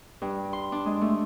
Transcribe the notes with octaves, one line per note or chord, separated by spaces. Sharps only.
G2
C6
D4
G#3
A3